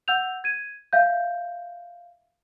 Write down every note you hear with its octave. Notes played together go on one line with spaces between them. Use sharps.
F#5 E6 G6 F7
G#6 D#7
E5 F5 G6